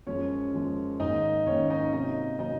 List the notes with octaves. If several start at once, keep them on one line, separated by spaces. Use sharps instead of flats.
F#2 F3 G#3 C#4 C#5
F#2 F3 G#3
G#2 D#3 A#3 D#4 D#5
G#2 D#3 A#3 C#4 C#5
D#4 D#5
C3 F#3 A#3 D#4 D#5
C3 F#3 A#3 D#4 D#5